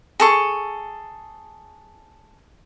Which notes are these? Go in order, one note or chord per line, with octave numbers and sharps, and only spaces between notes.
G#4 A4 C#6